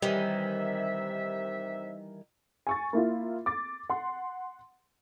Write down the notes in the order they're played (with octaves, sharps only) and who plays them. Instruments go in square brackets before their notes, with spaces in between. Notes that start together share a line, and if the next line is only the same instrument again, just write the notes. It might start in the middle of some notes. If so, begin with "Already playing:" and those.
[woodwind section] C3 G4 E5 [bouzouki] D#3 E3 [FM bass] G3
[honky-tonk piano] G#5 C#6 A6
A#3 E4 F4
D6 A6
F#5 C6